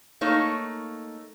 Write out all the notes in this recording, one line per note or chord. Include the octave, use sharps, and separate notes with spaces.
A3 A#3 D#4 C#5